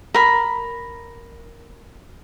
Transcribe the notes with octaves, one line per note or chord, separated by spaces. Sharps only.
A#4 B5